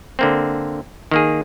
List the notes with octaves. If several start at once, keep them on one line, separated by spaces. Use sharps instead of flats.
D3 A#3 C4
D#3 A#3 G#4